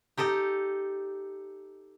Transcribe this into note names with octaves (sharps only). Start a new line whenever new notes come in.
D#4 G4 A4 D#5